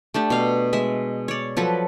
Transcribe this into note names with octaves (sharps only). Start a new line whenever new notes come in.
A3 D4 G4
B2 F5
G#3 E5
C#5 D5
F3 F#3 A4 B4